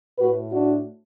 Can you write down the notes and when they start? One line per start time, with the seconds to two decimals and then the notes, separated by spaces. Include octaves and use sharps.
0.19 A2 A3 F#4 B4
0.52 D4 F#4